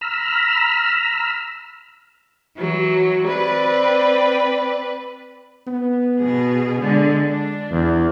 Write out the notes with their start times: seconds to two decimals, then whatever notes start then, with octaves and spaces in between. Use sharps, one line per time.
0.01 A#5 B5 E6 F6
2.57 E3 F#3
3.27 C4 B4 D5
5.67 B3
6.19 B2 G#4
6.81 D3 G#3
7.27 D4
7.71 E2